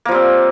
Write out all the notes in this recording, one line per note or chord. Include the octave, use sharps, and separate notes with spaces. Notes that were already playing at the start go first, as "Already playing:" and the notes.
F3 G3 A#3 C4